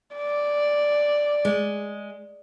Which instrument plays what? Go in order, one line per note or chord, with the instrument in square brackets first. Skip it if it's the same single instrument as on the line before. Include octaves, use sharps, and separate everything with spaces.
[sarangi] D5
[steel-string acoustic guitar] G#3